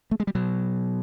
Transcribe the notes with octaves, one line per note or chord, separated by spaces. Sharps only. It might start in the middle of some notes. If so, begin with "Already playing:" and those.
A3
G#3
G3
B2 F#3